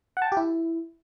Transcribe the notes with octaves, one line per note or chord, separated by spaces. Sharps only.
F#5
A5
G5
G4
E4